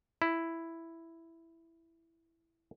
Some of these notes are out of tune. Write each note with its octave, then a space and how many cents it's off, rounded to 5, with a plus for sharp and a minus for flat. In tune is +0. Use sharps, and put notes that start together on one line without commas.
E4 +5